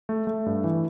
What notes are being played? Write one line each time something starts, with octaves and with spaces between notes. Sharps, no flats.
A3
A3
G2
E3